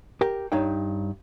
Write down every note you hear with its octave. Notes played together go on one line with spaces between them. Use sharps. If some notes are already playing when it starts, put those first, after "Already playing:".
G4 A#4 G5
G2 D#4 C#5 F5 G5